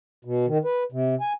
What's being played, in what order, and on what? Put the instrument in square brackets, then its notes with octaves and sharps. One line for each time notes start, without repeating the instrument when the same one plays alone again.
[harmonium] B2
D#3
B4
C3
G#5